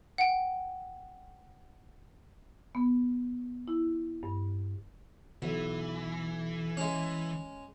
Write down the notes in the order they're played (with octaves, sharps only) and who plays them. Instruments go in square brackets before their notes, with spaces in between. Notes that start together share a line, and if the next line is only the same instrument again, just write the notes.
[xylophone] F#5 G5
[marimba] B3
E4
G2
[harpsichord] B1 [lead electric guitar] E3
[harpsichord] G#3 C#4